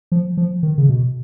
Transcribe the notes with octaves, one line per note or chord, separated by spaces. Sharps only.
F3
F3
D#3
C#3
B2